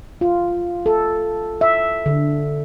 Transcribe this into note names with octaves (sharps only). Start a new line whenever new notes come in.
F4
A4
E5
D3